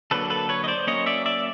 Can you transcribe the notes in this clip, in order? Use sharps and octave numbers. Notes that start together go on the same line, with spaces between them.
D3 F#3 A#3 A4 B4
A4 B4
B4 C#5
D#5
C5 D5
F#3 A#3 C#4 C#5 D#5
D5 E5
D5 E5